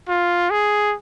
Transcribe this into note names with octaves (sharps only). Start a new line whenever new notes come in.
F4
G#4